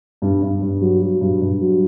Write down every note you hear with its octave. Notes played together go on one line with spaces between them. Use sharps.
G2
G2
G2
F#3
F#3
G2
G2
F#3